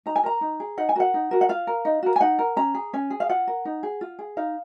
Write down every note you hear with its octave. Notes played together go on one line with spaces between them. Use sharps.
D#4 A#5
G#5
A#4 A#5
D#4
G#4
D#4 F#5
G#5
F#4 A#4 F#5
D#4
F#4 A#4
F#5
F4 F5
A#4
D#4
F#4 A#4
G#5
D#4 F#5
A#4
C#4 A#5
G#4
C#4 G#5
G#4
F5
F4 F#5
A#4
D#4
G#4
F4
G#4
D#4 F5